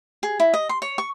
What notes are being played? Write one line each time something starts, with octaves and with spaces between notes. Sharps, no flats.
G#4
E4
D#5
C6
C#5
C#6